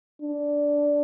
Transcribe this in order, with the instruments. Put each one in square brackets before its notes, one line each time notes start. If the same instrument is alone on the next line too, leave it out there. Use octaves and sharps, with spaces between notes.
[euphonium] D4